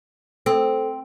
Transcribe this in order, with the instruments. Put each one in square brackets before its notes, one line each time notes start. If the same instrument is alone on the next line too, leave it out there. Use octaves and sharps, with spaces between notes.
[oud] C4 [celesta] A4